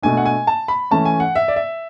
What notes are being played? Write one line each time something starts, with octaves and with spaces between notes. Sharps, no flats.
B2 A3 D4 G#5
F#5
G#5
A5
B5
E3 A3 C#4 A5
G#5
F#5
E5
D5
E5